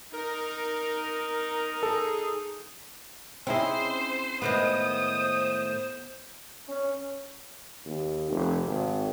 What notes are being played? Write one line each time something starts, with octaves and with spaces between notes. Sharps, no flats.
D#4 A#4
G#4 A4
C4 C#4 D#4 E4 G#4 C5
A2 D#3 G#3 B3 C5 D#6
C#4
D#2
F1
G#1